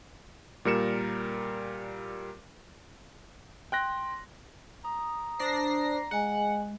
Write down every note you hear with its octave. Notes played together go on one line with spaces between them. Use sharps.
A#2 G3 A#4 C#7 E7
G5 C6 F#6 A#6
A#5 D#6
D4 C5 A#6 C7
G#3 G#4 D#5 F#5 G#5